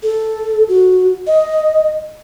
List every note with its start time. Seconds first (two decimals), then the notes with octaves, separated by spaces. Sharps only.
0.03 A4
0.69 F#4
1.27 D#5